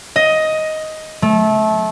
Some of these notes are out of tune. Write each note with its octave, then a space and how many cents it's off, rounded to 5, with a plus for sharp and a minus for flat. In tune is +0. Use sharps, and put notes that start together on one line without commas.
D#5 +10
A3 -25